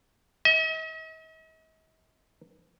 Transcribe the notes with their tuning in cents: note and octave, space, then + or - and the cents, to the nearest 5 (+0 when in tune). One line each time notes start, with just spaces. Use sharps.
D#5 +45